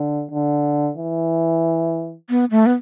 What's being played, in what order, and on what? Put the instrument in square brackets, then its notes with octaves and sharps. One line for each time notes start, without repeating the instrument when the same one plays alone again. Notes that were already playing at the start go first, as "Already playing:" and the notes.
Already playing: [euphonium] D3
D3
E3
[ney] B3
A3
B3